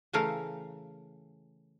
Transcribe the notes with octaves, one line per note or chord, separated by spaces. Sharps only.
C#3 E3 A3 A#4 F5